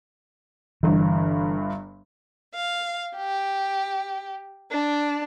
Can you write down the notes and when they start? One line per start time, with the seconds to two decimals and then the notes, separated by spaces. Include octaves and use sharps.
0.83 G1 G2 E3
2.54 F5
3.15 G4
4.70 D4